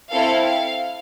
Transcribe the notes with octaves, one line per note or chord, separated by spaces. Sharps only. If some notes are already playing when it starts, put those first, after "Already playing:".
C4 E4 A4 F5
F5